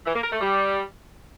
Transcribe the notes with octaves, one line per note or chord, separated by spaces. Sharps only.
E3
A#3
A#4
A3
G3